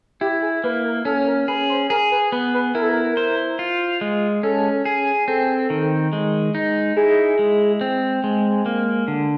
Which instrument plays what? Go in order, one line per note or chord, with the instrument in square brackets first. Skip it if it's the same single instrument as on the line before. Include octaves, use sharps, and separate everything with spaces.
[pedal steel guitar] E4 [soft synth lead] G4
[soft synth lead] G#4
[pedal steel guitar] A#3 [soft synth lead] B4
[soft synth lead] A#4
[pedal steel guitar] C#4 [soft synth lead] A4
[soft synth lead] A#4
[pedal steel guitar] G#4 [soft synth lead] B4
[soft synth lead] C5
[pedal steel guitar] G#4 [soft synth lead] A#4
[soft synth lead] B4
[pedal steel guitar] B3 [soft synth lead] B4
[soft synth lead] B4
[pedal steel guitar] E4 [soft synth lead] A#4
[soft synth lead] A4
A#4
[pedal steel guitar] C5
F4
G#3
[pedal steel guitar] C#4 [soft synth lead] A4
[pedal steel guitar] G#4
[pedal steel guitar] C4 [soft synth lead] A4
[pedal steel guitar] D#3
G#3
D#4
[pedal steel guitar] E4 [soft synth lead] G#4
[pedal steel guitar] G#3
C4
G#3
A#3
D3